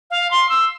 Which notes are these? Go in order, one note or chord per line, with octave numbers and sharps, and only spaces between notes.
F5
C6
E6